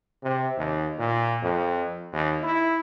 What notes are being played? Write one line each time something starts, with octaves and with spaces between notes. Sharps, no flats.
C3
D#2
A#2
F2
D#2
E4